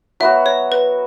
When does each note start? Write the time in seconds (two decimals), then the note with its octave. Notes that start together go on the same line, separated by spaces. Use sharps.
0.20 F#3 B3 F#4 E5
0.46 C#5
0.72 B4